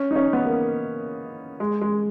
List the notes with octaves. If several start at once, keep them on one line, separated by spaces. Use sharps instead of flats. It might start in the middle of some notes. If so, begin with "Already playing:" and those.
Already playing: C#4
D#4
C#4
B3
A#3
G#3
G#3